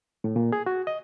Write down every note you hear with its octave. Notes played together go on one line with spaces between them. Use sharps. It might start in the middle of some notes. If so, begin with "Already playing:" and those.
A2
A#2
G#4
F#4
D#5